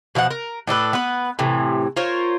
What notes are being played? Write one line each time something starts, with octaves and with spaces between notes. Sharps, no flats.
B2 F3 G4 F#5
A#4
A2 D4 A4 B4
B3 B4
A2 C3 E3
F4 A#4 C5 C#5